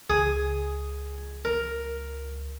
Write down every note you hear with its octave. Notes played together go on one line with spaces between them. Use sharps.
C#2 G#4 D#6
A#4